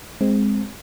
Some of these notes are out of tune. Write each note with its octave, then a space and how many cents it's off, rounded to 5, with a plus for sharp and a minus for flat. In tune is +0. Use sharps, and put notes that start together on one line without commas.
G#3 +0 C4 +0